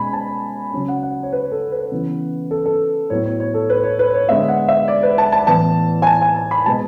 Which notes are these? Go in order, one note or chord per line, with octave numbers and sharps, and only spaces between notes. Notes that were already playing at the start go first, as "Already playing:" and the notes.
Already playing: B2 G#3 C#4 G#5 B5
A5
C#3 F#3 C#4
F#5
F#5
C#5
B4
A4
B4
C#3 E3 B3
A4
A4
A2 F#3 B3 C#5
C#5
C#5
A4
B4
C#5
B4
C#5
D3 G#3 B3 E5
F#5
E5
D5
B4
A5
A5
A2 E3 B3 A5
G#5
A5
G#5
A5
B5
B2 G#3 B3 A5